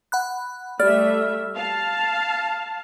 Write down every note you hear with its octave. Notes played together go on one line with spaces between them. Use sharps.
F#5 B5 F#6
G3 A3 D5 E5 F6
F5 A5